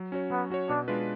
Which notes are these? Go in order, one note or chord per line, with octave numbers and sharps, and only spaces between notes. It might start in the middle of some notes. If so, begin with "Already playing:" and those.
Already playing: F#3
C#4 F#4 C#5
F#3 B3
C#4 F#4 C#5
B2 D4
G#3 D4 F4 B4